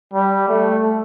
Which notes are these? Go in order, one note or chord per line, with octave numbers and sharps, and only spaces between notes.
G3
A3